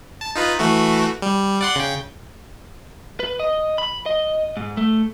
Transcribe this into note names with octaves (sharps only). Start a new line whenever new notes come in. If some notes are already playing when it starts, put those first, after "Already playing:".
A5
D#4 F4 B4
E3 A3 F#4
G3
D5 F#5 C6
C#3 G5
B4
D#5
B5
D#5
G#2
A3